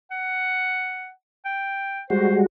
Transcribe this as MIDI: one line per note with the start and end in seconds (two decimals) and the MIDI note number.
0.11 1.10 78
1.45 2.02 79
2.10 2.46 55
2.10 2.46 56
2.10 2.46 66
2.10 2.37 72